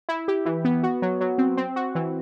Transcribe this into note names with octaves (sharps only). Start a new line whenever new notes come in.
E4
G4
E3
B3
F#4
F#3
F#3
C4
C4
F#4
E3